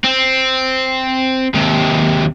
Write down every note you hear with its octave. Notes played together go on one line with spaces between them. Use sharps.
C4
D#2 C3